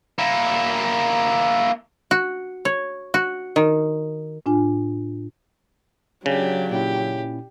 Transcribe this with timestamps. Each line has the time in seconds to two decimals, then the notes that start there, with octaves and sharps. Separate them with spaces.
0.19 A#3 E4
2.11 F#4
2.65 C#5
3.14 F#4
3.56 D#3
4.46 A2 D4 F4 G#5
6.26 C#3 F#3 D4 G4
6.71 A#2 C#4 E4 G4